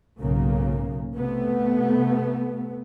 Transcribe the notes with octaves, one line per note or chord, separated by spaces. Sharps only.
B1 G#2 C#3 A#3
C3 A3 B3